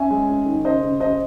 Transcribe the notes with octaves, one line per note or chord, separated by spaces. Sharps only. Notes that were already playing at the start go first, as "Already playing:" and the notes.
Already playing: C#4 E5 G#5
G#3
C#4
D#3
C#3 C5 D#5
C#3
C#3 C5 D#5